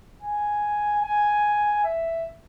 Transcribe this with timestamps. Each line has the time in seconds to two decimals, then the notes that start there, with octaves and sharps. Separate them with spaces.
0.22 G#5
1.03 G#5
1.84 E5